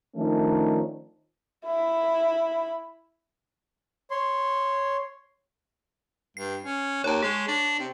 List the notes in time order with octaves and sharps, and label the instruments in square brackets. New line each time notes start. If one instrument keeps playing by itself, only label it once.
[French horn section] D#3 F3 A3 C#4 D4
[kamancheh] E4 B5
[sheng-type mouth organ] C#5 C6
[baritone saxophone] G2 [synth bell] C7
[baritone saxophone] C#4
[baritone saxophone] D#2 [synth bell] C#5 A5
[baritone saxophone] G#3 [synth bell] G#4
[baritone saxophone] D4
C3